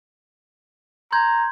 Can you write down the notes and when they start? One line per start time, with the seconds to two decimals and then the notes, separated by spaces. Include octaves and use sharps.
1.12 A#5 C6 G6 G#6